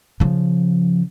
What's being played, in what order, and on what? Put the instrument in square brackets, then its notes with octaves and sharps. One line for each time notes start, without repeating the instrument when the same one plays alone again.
[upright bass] C#3 F3